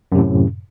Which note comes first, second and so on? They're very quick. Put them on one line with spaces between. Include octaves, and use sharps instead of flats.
F#2 C3 A2